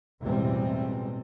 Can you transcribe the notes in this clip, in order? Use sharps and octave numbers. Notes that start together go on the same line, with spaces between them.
A1 E2 B2 G3 G#3 C4